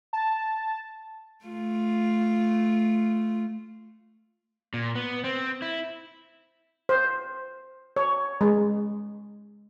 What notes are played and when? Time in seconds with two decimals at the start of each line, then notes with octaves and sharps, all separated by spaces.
0.13 A5
1.45 A3 F4
4.74 A#2
4.95 B3
5.24 C4
5.62 E4
6.89 C5
7.96 C#5
8.41 G#3